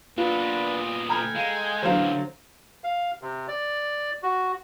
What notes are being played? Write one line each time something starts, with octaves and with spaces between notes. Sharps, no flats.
A#2 B3 D4 F4 B4
A4 G5 G#5 A#5 B5 F6
G#3 F5
F#2 D3 E3 F#3 A3 C5 F5
F5
C3
D5
F#4